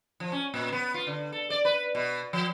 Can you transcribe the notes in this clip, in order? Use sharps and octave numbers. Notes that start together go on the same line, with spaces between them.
F3
C#4
A#2
B3
F4
D3
A4
D5
B4
B2
F3